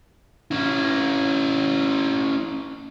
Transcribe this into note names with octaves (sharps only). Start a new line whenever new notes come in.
C#4 E4